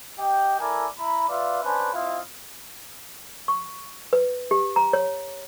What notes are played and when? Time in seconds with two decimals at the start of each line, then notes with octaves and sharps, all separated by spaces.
0.18 G4 D#5 G5
0.59 E4 A4 A#4 D5 G#5
0.99 E4 A#5 B5
1.29 F4 B4 D5 E5 F5
1.63 C#4 D4 B4 C5 G#5
1.94 C4 E4 F4 D#5 F5
3.48 C#6
4.13 B4
4.51 G4
4.76 A#5
4.93 C#5